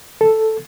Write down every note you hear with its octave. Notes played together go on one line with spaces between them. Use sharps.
A4